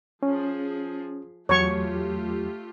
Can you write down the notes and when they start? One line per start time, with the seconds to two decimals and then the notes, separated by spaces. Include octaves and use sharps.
0.23 F3 C#4 G#4
1.49 E2 F#3 A3 F4 G4 C#5 C#6